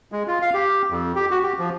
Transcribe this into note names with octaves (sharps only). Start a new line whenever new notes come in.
G#3
F4
F5
G4
F2
G4
F#4
G4
F3